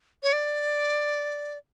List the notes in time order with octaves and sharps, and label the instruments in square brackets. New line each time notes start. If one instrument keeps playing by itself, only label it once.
[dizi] C#5
D5